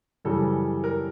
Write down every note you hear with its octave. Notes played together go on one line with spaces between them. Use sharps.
F#2 C#3 E3 G3 A4
A#4